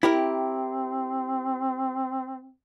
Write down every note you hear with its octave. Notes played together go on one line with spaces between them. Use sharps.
C4 E4 G4 A#4